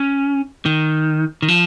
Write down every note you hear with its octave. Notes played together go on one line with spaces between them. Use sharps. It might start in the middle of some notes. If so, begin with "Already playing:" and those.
Already playing: C#4
D#3
D#3
F3